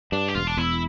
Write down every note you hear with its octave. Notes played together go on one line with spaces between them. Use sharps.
G2 D4
G4
E1 F4
D4
E2 E4